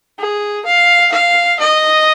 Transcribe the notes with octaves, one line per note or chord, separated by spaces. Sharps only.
G#4
F5
F5
D#5